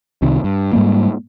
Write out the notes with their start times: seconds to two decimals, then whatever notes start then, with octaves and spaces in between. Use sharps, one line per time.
0.22 C2 C3 D#3
0.44 G2
0.73 G#2 G3 G#3 A#3